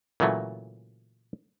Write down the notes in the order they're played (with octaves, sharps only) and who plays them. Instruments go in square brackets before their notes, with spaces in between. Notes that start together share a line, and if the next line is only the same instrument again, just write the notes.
[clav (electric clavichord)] A#2 C#3 E3 F#3 A3